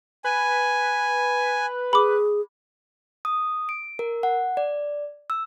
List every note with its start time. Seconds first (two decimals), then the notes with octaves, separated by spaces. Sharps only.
0.24 B4 G#5
1.93 G#4 B5 D6
3.25 D#6
3.69 D7
3.99 A#4
4.23 F#5
4.57 D5
5.30 E6